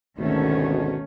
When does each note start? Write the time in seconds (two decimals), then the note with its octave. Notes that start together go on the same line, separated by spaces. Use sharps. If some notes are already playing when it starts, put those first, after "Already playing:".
0.18 G#1 D2 B2 D#3 A3 C#4